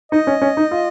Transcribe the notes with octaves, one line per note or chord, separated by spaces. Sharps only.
D#4 D#5
C#4
C#4
D#4
F4